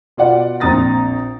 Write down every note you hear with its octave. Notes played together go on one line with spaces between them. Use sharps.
B2 F4 D5 F#5
A#1 C4 A#5 D#6 A6 A#6